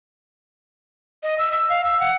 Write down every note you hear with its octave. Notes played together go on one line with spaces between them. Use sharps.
D#5
E6
E6
F5
E6
F#5